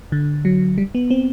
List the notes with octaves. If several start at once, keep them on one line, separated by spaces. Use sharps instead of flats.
D3
F#3
G3
B3
C4